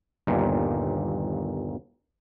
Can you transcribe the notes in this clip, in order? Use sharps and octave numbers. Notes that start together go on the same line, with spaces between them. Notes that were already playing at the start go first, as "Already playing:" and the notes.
G1 D#2 A#2